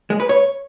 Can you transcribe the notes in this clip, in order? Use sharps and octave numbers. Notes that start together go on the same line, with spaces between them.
G#3
B4
C#5